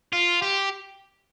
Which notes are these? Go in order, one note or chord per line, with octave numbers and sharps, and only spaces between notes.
F4
G4